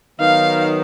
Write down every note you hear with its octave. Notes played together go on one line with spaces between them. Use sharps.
D#3 F#3 B3 D#4 F5